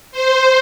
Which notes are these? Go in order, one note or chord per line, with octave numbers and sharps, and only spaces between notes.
C5